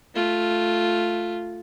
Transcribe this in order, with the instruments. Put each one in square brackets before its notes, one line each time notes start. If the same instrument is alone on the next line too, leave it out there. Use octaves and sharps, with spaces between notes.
[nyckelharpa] A3 F4